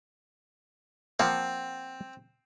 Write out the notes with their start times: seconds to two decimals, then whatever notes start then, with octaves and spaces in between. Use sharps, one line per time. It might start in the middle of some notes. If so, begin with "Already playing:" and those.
1.20 F3 A#3 C4 F5 F#5 A5